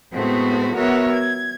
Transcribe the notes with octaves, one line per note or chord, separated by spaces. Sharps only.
A2 G#3 A3 B3 C4 F#4
B3 F#4 A#4 C#5 E5 F#5
G#6